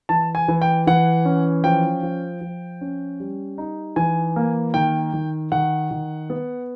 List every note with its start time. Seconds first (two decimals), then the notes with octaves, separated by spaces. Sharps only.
0.09 E3 A5
0.35 G#5
0.48 E3
0.62 G5
0.87 E3 F#5
1.25 C#4
1.64 F3 G5
2.03 F3
2.41 F3
2.81 C#4
3.20 G3
3.58 D#4
3.96 E3 G#5
4.36 A#3
4.74 D#3 G5
5.13 D#3
5.52 D#3 F#5
5.91 D#3
6.30 B3